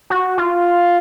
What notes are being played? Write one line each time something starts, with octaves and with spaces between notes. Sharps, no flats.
F#4
F4